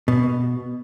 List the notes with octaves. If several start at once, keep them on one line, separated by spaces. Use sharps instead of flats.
B2